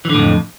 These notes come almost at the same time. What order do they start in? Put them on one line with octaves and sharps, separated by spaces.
E3 D3 A2 F2